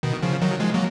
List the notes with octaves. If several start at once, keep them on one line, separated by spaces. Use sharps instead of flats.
B2 D#3
C#3 F3
D#3 F#3
F3 G#3
F#3 A#3